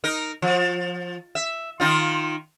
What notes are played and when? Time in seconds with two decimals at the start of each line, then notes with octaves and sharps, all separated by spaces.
0.04 D#4 A#4
0.42 F3
1.35 E5
1.80 D#3 D#4 F4